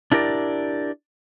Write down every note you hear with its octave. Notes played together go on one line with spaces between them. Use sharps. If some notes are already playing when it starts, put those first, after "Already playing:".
D4 E4 G4 A#4 D5